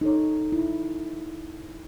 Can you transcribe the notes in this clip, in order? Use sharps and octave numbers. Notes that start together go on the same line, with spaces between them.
D#4 A4 C#5
E4